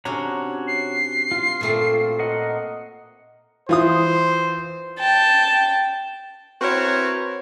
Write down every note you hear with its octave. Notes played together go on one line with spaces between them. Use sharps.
C3 C#4 D4 F#4 C#5 A#5
C7
F4
A#2 A3 C4
A#4 D#5 F#5
E3 F4 C5 D#6
G5 A5
C4 E4 F#4 A#4 B4 C#5